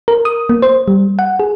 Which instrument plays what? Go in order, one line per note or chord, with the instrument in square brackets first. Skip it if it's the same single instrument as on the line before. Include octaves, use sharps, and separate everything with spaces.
[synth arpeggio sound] A#4
D#6
A#3
C5
G3
F#5
G#4